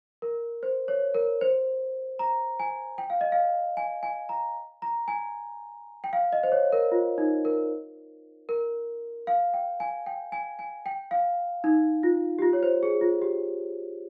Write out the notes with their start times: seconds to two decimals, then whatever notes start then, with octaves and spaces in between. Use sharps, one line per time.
0.22 A#4
0.63 C5
0.88 C#5
1.15 A#4
1.41 C5
2.19 A#5
2.59 G#5
2.98 G5
3.10 F5
3.21 D#5
3.32 F5
3.77 G#5
4.03 G#5
4.29 A#5
4.82 A#5
5.08 G#5
6.04 G5
6.13 F5
6.33 D#5
6.43 C5
6.52 C#5
6.73 A#4
6.92 F4
7.18 D#4
7.45 A#4
8.49 A#4
9.27 F5
9.54 G5
9.80 G#5
10.06 G5
10.32 G#5
10.59 G#5
10.86 G5
11.11 F5
11.64 D#4
12.03 F4
12.39 G4
12.42 F4
12.53 C#5
12.63 C5
12.83 G#4
13.01 F4
13.22 G4